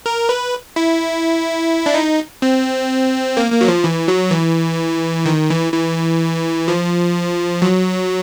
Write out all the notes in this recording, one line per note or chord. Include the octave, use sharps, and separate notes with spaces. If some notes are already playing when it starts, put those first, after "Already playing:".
A#4
B4
E4
D4
D#4
C4
A#3
A#3
F#3
F3
E3
F#3
E3
D#3
E3
E3
F3
F#3